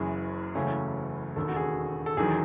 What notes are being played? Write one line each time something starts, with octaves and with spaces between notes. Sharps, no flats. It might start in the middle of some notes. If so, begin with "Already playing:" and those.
Already playing: F#1 F#2 E3 G#4
F#1 E2 C#3 F#3 A3 C#4
E1 D#2 D#3 A4
F#4
G#4
A4
E1 E2 D#3 F#3 G#4